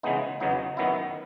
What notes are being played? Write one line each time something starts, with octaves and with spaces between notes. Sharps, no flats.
C#3 E3 G#3 B3 D#4
E2 C#3 F#3 B3 D#4
F#2 D#3 F#3 B3 E4